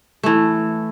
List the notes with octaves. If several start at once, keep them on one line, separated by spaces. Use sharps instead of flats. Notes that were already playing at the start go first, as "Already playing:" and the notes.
E3 A3